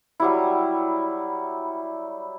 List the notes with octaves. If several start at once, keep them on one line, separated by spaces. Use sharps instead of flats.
F#3 G3 E4